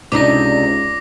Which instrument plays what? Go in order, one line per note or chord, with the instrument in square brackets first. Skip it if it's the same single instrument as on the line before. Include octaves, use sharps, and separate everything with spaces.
[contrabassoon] C#2 [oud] C3 D4 D#4 [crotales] D6 A#6